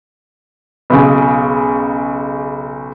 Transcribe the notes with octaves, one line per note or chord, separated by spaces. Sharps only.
B1 C#3